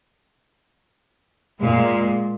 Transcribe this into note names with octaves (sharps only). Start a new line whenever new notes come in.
A#2 G#3